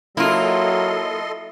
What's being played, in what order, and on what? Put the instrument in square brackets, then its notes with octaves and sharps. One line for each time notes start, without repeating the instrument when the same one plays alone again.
[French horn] F#3 [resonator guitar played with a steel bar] A#3 F4 [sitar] E4 [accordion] A4 D#5 C6